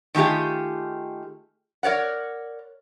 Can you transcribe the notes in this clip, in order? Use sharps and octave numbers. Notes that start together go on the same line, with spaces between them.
D#3 A3 F4 G4 G#4
A#4 C#5 D5 F#5